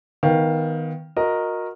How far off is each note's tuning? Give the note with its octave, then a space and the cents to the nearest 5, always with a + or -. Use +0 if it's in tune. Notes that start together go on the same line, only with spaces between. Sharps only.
D#3 +20 B3 +10 F5 +0
F#4 -30 A#4 +0 D#5 +0